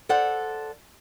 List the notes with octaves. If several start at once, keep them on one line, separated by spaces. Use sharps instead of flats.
A4 C5 D5 F#5